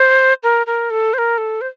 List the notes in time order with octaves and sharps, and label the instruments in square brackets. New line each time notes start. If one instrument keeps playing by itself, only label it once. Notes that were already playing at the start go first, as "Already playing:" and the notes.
Already playing: [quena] C5
A#4
A#4
A4
C5
A#4
A4
C5